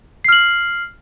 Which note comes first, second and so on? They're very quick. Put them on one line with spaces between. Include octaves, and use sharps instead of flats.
C7 F6 F#7